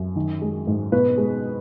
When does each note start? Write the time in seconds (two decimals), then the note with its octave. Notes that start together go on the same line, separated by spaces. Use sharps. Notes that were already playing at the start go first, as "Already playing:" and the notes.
Already playing: F#2
0.16 D#3
0.42 G#3
0.67 G#2
0.92 B2 B4
1.18 G#3